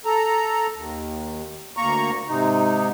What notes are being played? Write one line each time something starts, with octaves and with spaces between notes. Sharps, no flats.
A4 A#5
D#2
D2 A#3 A#5 C#6
G#2 C3 D#4